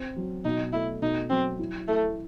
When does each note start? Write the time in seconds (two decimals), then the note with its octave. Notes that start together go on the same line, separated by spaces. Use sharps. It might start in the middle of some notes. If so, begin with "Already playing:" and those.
Already playing: C4
0.16 F#3
0.45 B2 D#4
0.73 A3 E4
1.02 B2 D#4
1.30 F#3 C4
1.59 E4
1.88 A3 E4